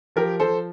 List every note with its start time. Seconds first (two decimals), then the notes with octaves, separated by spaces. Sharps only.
0.16 F3 G4 A#4
0.40 F3 A4 C5